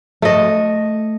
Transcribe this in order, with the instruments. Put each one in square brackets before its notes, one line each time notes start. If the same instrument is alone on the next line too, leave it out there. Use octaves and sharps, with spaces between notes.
[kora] A3 D#5